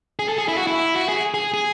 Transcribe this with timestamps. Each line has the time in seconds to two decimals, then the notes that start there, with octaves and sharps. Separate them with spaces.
0.19 G#4
0.28 A4
0.38 G#4
0.48 E4
0.57 F#4
0.67 E4
0.96 F#4
1.09 G#4
1.34 G#4
1.54 G#4